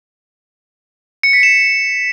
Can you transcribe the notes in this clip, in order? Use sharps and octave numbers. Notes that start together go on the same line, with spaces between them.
C#7
B6
E7